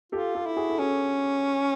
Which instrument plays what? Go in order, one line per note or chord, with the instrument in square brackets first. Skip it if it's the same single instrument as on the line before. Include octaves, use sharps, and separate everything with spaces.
[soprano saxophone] F4 [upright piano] G4 A4
[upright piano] G4 A4
[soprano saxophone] E4
[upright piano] F#4 G#4
A4
[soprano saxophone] C#4 [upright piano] F#4 G#4